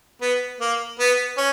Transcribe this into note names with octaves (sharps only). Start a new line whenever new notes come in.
B3
A#3
B3
C#4